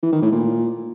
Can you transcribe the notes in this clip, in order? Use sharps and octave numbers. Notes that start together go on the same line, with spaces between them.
E3
D#3
A2
A#2